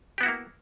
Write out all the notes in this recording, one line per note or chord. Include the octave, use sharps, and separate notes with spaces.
A#3 B3 E4 F#4 G4